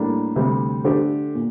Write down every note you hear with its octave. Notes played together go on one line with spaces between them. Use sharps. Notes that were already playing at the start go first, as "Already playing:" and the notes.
Already playing: A2 G3 A#3 D4
D2 C3 G3
D3 A3 D4 G4 C5
A#2